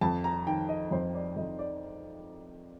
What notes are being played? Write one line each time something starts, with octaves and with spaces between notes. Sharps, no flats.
F2 A5
A#5
D#3 G5
D#5
F2 C5
D5
F2 D#5
D5